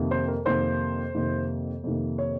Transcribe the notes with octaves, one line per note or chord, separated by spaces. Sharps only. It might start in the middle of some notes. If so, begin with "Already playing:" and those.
Already playing: F2 C3 D#3 A#3
C5
A#4
F2 C3 D#3 A#3 C5
F2 C3 D#3 A#3
F2 C3 D#3 A#3
C#5